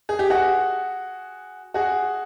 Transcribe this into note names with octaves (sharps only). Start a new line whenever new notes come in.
G#4
G4
F#4 G#4
F#4 G#4